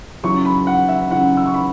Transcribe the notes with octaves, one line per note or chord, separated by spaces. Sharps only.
C#3 F#3 C#4 E4 C#6
B5
F#5
E5
C#3 F#3 C#4 E4 F#5
E6
C#6
B5